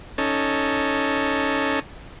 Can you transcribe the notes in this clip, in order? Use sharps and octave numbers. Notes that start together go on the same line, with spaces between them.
C#4 D#4 A4